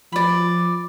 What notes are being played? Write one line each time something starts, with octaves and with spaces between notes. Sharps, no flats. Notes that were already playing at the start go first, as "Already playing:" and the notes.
F3 D5 B5